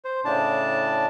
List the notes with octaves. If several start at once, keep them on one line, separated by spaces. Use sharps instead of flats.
C5
A2 C#3 D4 A5